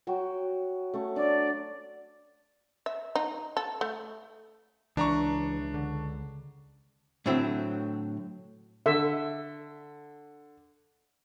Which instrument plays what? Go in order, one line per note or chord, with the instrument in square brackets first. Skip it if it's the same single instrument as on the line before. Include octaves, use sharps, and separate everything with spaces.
[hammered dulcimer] F#3 F#4 G5
A3 C#4 C#6
[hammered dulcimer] D4 [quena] D5
[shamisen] E5
D#4
A4
A3
[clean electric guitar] C#2 [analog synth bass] E3 [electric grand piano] D4 A#5 C#6
[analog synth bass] D3
[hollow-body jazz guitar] A2 D3 F#3 C4 E4
[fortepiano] D3 [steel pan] E5